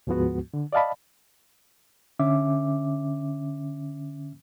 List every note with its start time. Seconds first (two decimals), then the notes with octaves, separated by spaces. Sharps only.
0.07 D2 G#2 F3 G#3 B3 F#4
0.54 D3
0.73 D5 D#5 F5 A5 B5
2.20 D3 C#4 E5 D6